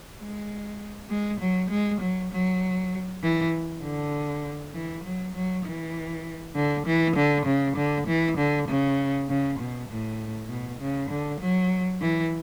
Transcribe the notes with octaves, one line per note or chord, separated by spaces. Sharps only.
G#3
G#3
F#3
G#3
F#3
F#3
E3
D3
E3
F#3
F#3
E3
D3
E3
D3
C#3
D3
E3
D3
C#3
C#3
B2
A2
B2
C#3
D3
F#3
E3